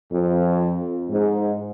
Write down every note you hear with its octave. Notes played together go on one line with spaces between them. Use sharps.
F2
G#2